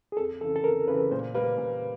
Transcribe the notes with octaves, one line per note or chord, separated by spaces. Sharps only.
G#4
F2 A4
C#3 E3 A4
A4
F2 A#4
C#3 E3 B4
A#2 C5
G3 A#3 B4
A#2